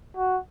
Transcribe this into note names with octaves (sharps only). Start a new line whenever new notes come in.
F#4